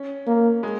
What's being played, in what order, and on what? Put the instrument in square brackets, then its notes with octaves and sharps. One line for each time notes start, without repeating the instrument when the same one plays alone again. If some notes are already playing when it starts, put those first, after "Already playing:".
Already playing: [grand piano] C#4
[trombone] A#3
[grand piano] G#3